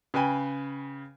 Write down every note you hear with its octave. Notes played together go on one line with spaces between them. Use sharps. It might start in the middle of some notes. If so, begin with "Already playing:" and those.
C#3 B4 G5 G#5 D#7